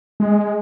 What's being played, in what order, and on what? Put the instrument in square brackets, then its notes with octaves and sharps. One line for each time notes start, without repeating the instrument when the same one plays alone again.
[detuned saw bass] G#3